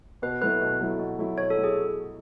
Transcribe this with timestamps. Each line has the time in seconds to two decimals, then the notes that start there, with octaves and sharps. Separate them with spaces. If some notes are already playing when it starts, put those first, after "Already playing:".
0.22 B2 B4
0.42 F#3 A3 E4 B4
0.61 B2
0.81 F#3 A3 E4
0.99 B2
1.19 F#3 A3 E4
1.38 B2 C#5
1.50 A4
1.57 F#3 A3 E4
1.64 G#4